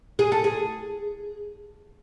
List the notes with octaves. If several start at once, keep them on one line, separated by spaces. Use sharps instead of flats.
G#4
A4
G#4